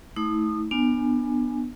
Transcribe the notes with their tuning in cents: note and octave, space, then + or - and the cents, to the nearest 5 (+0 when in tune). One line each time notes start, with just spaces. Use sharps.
A3 -5 E4 -45 D#6 -30
B3 +0 D4 +25 G#5 +0